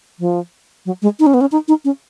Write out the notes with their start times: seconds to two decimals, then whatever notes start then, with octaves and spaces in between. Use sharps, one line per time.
0.19 F3
0.86 F#3
1.02 G#3
1.19 D#4
1.26 C#4
1.34 B3
1.41 C#4
1.52 D#4
1.68 D#4
1.85 C#4